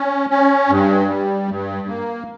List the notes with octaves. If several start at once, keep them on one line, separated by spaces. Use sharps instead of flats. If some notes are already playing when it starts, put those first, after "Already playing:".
Already playing: C#4
C#4
G2
G3
G2
A#3